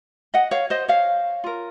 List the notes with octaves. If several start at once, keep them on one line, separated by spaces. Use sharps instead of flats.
D#5 F#5
C#5 F5
C5 D#5
C#5 F5
F4 A#4